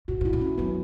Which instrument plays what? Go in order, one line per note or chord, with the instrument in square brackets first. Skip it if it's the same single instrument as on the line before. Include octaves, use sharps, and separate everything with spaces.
[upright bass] B2 [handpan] F#4
[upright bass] A#2
[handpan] E4
[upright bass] A#2
[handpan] C#4
[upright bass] F#2 [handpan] B3